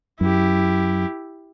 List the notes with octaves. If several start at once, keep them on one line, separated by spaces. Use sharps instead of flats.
F#2 E4 G4